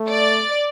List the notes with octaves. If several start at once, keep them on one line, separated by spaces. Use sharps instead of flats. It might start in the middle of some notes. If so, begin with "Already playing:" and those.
Already playing: A3
D5